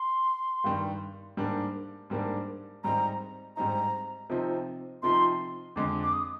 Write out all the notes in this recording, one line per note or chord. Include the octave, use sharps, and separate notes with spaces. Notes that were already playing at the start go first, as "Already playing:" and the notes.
Already playing: C6
G2 D#3 G3
G#2 G3 A#3 D4
G#2 G3 A#3 D4
G#2 G3 C4 D#4 A#5
G#2 G3 C4 D#4 A#5
C3 F3 C4 D#4
C3 F3 C4 D#4 C6
F2 D3 G#3 D6
D6
D#6